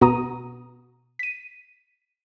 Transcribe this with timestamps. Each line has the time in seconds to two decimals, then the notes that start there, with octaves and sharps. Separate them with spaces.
0.01 B2 B3 F#4 A#5 D#6 D#7
1.19 B6 D#7